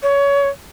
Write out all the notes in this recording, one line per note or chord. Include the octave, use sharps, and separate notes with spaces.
C#5